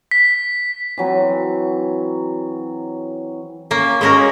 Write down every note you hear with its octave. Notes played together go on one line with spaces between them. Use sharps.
B6
E3 F#3 C4
A#3 C#4
G#3 A#3 C#4 F#4 A#4